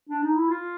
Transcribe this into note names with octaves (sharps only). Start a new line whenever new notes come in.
D4
D#4
E4
F4